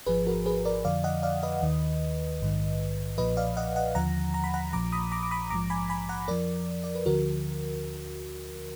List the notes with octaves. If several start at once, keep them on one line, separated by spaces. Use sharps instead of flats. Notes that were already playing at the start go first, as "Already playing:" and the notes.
G#1 G#2 F3 G#4 B4
F#4 A#4
G#4 B4
A#4 D5
F2 D3 F3 D5 F5
D#5 F#5
D5 F5
B4 D#5
D#2 D#3
A#1 G#2 D#3
B1 A#2 F3 B4 D#5
D5 F5
D#5 F#5
D#5 F#5
D#2 D3 F3 F#5 A#5
A#5
B5
F#5 A#5
A#1 A#2 F3 A#5 D6
B5 D#6
A#5 D6
D6
B5 D#6
A#1 G#2 F3 A#5 D6
G#5 B5
G#5 B5
F#5 A#5
F2 F3 A#4 D5
D5
B4
D2 D3 F3 F#4 A#4